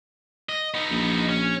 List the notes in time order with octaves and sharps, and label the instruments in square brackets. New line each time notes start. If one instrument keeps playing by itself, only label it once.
[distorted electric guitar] D#5
B3 D#4
[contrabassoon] A#1
[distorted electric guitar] C#4